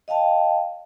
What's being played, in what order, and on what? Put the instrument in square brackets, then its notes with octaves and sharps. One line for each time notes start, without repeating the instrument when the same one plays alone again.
[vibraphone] D#5 F5 G5 A5